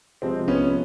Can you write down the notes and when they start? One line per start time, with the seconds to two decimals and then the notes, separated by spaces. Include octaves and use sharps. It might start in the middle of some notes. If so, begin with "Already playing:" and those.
0.22 C3 F3 G#3 C4
0.48 B3 C#4